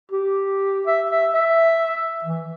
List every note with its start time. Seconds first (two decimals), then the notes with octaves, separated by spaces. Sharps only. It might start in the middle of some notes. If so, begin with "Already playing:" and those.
0.11 G4
0.87 E5
1.10 E5
1.34 E5
2.24 E3